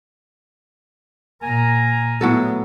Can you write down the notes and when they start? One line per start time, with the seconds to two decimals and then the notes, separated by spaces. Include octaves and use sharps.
1.42 A#2 A#4 G#5 A#5
2.21 A2 F#3 B3 A4